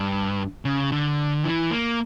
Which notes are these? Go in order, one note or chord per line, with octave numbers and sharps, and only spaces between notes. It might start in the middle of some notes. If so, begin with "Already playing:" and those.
Already playing: G2
C#3
D3
E3
A#3